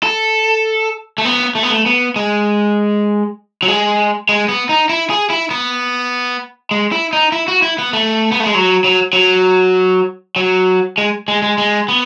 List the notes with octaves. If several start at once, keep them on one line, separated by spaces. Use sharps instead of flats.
A4
A3
B3
A3
B3
A3
B3
G#3
F#3
G#3
G#3
B3
D#4
E4
G#4
E4
B3
G#3
E4
D#4
E4
F#4
E4
B3
A3
B3
A3
G#3
F#3
F#3
F#3
F#3
G#3
G#3
G#3
G#3
B3